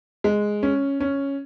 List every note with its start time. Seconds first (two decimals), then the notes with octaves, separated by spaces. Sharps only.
0.24 G#3
0.63 C#4
1.00 C#4